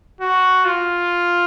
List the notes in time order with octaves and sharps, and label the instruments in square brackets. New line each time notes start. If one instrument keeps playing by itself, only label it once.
[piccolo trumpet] F#4
F4